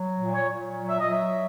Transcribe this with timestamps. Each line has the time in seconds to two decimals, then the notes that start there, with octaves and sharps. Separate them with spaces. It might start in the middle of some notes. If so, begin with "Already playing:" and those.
Already playing: F#3
0.18 A#2
0.33 C#5
0.49 A#2
0.78 F#3
0.89 E5
0.99 D#5
1.08 F#3 E5